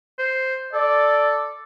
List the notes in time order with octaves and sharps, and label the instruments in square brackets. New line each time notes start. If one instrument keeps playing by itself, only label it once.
[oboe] C5
[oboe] A4 [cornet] D5